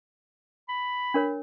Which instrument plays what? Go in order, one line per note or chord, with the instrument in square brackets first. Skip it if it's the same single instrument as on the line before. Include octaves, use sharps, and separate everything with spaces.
[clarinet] B5
[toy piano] D4 A#4 C#5